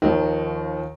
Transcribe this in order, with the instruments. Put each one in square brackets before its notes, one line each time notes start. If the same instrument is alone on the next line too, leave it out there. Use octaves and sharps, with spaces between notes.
[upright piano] D#2 F3 [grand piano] D#3